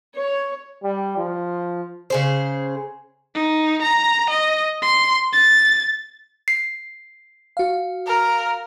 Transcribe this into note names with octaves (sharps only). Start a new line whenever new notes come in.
C#5
G3
F3
C#3 G#4 C5
D#4
A#5
D#5
C6
A6
C7
F#4 F5
A#4